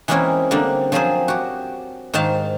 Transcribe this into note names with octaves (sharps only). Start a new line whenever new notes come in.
E3 G#3 A#3 C4 C#4 E4
D3 G3 A#3 C4 D4
F3 F#3 C4 F4 G#4 C5
F#4 G4
G#2 D#3 C5 F5 A5